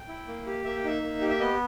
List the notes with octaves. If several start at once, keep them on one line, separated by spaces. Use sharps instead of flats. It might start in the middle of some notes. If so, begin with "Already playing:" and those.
Already playing: G5
E4
A#3
G4
A#3 E5
G5
D#4 E5
A#3
G4
E5
B3 D#5